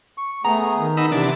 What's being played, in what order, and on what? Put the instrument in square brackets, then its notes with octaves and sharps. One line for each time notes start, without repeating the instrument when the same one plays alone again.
[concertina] C#6
[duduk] A3 [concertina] B3 G#4 [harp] A#5
[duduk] D#3
[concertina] B3 [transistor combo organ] D#4 B5 E6
[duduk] C3 [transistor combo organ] E3 D4